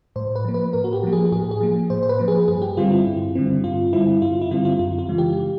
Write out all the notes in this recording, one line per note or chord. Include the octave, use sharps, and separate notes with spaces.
A2 C5
B4
F3 A#3
B4
A2 A#4
F#4
G4
F3 A#3
G#4
A2 G#4
G#4
F3 A#3
A2 C5
C5
B4
F3 A#3
G#4
G2 G#4
G4
D3 G3 C4 F4
E4
G2
D3 G3 C4
G2 F4
D3 G3 C4 E4
G2 F4
E4
D3 G3 C4 F4
F4
F#2 F4
F4
C#3 E3 G#3
G4